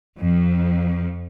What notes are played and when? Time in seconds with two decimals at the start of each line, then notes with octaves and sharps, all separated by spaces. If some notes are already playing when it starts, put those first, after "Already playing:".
0.19 F2